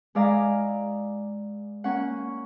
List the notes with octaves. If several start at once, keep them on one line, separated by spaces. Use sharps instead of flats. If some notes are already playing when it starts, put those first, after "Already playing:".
G#3 E4 D5 F5 G#5 A#5
A#3 C#4 F#5